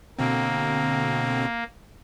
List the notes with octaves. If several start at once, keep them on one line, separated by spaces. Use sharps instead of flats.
B2 D3 A#3 C4